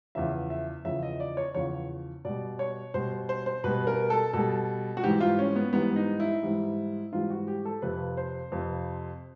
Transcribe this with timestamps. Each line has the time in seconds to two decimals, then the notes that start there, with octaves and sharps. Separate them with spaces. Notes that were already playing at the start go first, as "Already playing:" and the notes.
0.15 E2 C#3 F3 E5
0.50 E5
0.85 E2 C#3 F3 E5
1.03 D#5
1.20 D5
1.37 C#5
1.54 E2 C#3 F3 C#5
2.25 B2 G3 D5
2.59 C#5
2.94 B2 G3 C5
3.29 C5
3.46 C5
3.64 B2 G3 B4
3.87 A#4
4.10 A4
4.33 B2 G3 A4
4.97 F#4
5.03 G#2 E3 G3 G4
5.21 F4
5.39 C#4
5.56 B3
5.73 G#2 E3 G3 B3
5.96 D#4
6.20 E4
6.42 G#2 E3 G3
7.12 G#2 E3 G3 F4
7.30 F#4
7.48 G4
7.65 A4
7.82 F2 C3 F3 B4
8.17 C5
8.52 F2 C3 F3